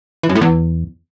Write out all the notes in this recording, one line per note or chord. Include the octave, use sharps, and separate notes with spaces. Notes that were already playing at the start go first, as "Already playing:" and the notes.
E3
F#2
A2
E2